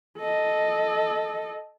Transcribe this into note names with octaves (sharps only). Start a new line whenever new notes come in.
A4 D#5